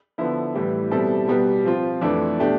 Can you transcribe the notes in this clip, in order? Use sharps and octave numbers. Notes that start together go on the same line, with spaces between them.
D3 F3 B3 E4
A2 E3 G3
B2 G3 C4 E4 A4
B2 G3 B3
F3 C4 F4
F2 E3 A3 D4
B2 A3 D4 G4